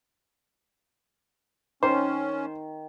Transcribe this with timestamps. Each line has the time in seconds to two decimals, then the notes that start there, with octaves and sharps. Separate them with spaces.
1.83 D#3 C#4 C5